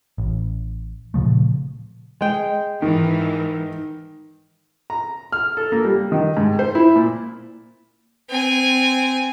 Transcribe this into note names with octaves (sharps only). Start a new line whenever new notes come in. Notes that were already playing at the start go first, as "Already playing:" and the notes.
A1
A#2 C#3 F3 A3
G#3 G5
G#2 D#3 E3
A#5
F6
A4
A#3
G3
D#3
G#2
C5
E4
A#2
C4 G#5